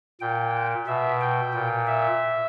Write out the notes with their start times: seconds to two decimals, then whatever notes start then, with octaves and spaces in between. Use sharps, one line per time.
0.21 A#2 G5
0.87 B2 E5
1.21 G5
1.54 A#2
1.87 E5